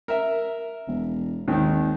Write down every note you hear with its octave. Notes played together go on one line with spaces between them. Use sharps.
A#4 E5
E1
G#1 D#2 D#3